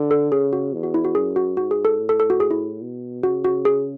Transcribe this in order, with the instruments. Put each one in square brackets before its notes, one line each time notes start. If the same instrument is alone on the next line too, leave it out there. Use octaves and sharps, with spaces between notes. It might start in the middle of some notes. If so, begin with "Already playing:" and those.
Already playing: [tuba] D3
[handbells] A4
[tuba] C#3 [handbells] G#4
[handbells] F#4
[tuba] E2
[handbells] F#4
E4
F#4
[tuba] F#2 [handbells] G#4
[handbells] F#4
[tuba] G#2 [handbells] F#4
[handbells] G#4
A4
[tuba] A2
[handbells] A4
A4
F#4
G#4
E4
[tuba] B2
[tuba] C#3 [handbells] F#4
[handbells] F#4
G#4